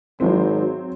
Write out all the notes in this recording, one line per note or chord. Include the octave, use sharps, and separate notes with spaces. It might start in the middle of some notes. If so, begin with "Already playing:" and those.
G#1 F#3 C4